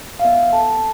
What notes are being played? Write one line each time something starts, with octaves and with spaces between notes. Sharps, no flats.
F5
B3 E5
A4 A5